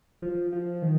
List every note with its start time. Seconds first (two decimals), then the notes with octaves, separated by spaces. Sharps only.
0.22 F3
0.52 F3
0.82 D#3